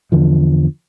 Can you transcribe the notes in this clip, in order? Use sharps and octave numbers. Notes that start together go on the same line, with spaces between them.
E2 D3 F3